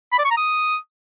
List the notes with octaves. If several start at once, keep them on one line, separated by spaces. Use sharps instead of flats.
B5
D5
C#6
A#5
D#6